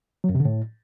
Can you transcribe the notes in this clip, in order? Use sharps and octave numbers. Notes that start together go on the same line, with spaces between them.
F#3
F#2
C3
D3
A2